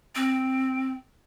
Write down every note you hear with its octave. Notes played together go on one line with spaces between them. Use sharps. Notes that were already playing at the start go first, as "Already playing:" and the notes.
C4